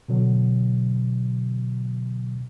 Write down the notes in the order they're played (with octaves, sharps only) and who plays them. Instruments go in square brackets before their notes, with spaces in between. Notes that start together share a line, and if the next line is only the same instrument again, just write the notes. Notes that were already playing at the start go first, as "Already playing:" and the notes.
[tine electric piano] B2 D3 F#3